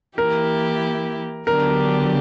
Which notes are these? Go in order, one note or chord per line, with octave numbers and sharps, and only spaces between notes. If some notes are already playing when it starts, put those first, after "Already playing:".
E3 A#3 E4 G4 A#4
D3 F#3 B3 D4 G4 A#4